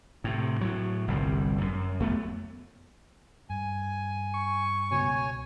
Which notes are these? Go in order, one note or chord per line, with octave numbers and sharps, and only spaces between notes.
A2 C3
A2 F#3
G1 C2 G3
F#2
F2 A3 B3
G2 G#5
C#6
C#2 B2 C#5 G#5